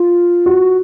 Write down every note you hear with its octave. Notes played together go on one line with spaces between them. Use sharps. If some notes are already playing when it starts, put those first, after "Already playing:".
Already playing: F4
F#4